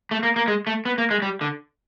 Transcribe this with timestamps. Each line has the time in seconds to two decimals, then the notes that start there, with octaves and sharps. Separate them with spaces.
0.11 A3
0.23 A#3
0.36 A#3
0.48 G#3
0.67 A3
0.85 B3
0.98 A#3
1.11 G#3
1.22 G3
1.41 D3